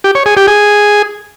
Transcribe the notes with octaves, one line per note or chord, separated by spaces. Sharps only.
G4
C#5
G#4
G4
G#4